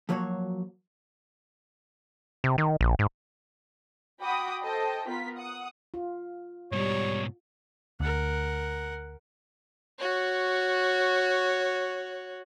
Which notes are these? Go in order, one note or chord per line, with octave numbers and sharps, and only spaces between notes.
F3 F#3 A#3 F#4 C#5
C3
D#3
A#1
G#2
F#4 G5 B5 D6 D#6
A4 C5 D#5 G5 A5
B3 F4 A#4 B6
F#5 D#6
F4
G#2 B2 G3 C#5
D2 A#4 F#5
F#4 C#5